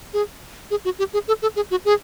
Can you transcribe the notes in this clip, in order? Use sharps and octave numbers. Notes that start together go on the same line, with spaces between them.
G#4
G#4
F#4
G4
G#4
A4
A4
G#4
F#4
G#4